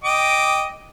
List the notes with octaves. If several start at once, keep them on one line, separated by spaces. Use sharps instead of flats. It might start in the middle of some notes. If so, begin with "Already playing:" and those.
D#5 G5 D6